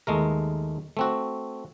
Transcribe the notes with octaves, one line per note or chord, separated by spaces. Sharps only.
D#2 G#3 A3 A#4
A3 C4 F#4